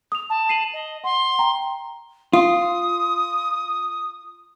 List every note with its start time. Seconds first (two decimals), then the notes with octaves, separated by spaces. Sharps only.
0.12 D#6 F7
0.29 A5
0.49 C7 D#7 F#7
0.73 D#5
1.04 F#5 C6
1.39 G5 A#5
2.33 F4 D#6